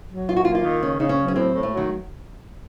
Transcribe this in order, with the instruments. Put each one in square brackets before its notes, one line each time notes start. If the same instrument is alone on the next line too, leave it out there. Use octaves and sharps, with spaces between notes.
[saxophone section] F#3
[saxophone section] F#2 [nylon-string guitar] F4
[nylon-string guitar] F#4
[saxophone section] A#3 [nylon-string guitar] F4
[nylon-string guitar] F4
[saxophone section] D#3
[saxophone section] C#3 [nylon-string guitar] C#4
[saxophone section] C#3 [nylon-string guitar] D#4
[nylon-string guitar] C#4
[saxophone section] F#3
[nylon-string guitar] C#4
[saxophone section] A2 [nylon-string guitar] C4
[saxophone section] A2
[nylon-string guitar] A3
[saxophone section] F#3
[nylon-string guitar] D#3